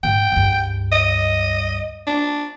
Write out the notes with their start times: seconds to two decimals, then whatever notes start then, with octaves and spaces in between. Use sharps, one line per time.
0.03 G#2 C4 G5
0.32 C#2 G2
0.92 D#5
2.07 D4